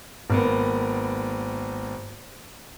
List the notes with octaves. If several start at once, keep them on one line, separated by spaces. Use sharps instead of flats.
G#1 A#3 B3